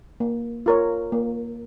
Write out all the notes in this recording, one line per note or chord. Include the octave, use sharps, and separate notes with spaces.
A#3
F4 A#4 C#5
A#3